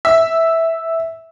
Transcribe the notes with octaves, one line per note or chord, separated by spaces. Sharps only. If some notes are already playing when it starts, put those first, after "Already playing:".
E5